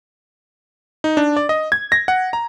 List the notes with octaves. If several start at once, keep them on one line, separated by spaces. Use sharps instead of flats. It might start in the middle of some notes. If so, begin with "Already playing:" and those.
D#4
D4
D5
D#5
G#6
A#6
F#5
A#5